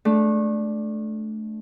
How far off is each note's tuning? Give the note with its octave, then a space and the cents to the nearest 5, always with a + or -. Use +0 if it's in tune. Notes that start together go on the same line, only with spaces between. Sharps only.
A3 -20 D4 +0